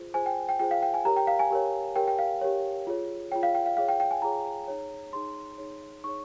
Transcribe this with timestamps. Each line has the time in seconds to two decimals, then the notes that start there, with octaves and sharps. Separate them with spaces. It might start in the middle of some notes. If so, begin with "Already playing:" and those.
Already playing: F4 G#4 C5
0.14 F4 G#4 C5 G#5
0.26 G5
0.49 G5
0.59 F4 G#4 C5 G5
0.71 F5
0.82 G5
0.94 G#5
1.05 G4 A#4 C#5 A#5
1.16 G5
1.27 F5
1.39 G#5
1.50 G4 A#4 C#5
1.96 G4 A#4 C#5 G5
2.08 G5
2.19 F5
2.41 G4 A#4 C#5
2.87 F4 G#4 C#5
3.32 F4 G#4 C#5 G5
3.43 F5
3.55 G5
3.66 F5
3.77 F4 G#4 C#5 F5
3.89 G5
4.00 G5
4.11 G#5
4.22 F4 G#4 C#5 A#5
4.68 D#4 G#4 C#5
5.13 D#4 G#4 C#5 C6
5.58 D#4 G#4 C#5
6.04 D#4 G#4 C#5 C#6